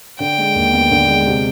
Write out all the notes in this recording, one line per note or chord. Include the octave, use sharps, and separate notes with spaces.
D3 G5
G#3
D#2
B3
D3
G#3
C3